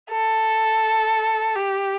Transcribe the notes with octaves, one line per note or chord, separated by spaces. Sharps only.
A4
G4